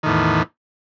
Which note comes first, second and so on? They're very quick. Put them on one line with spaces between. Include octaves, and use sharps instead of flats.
D#3 A2 E2